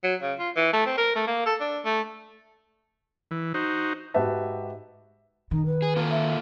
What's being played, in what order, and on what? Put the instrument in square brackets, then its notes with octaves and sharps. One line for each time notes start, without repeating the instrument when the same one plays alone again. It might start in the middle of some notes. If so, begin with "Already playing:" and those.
[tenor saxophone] F#3
C#3
F4
E3
A3
C4
A#4
A3
A#3
A4
D4
A3
[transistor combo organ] E3
D#4 F#4 C5
[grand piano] G#2 F#4 G4 B4 E5 A5
[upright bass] D#3 [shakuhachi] D#4
[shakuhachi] B4
[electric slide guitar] G#4
A#3 F4 A4
[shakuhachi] E5